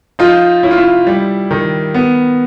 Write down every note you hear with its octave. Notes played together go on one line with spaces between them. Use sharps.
F3 D#4 F4
C#4 E4
F4
E4
G3
D#3
B3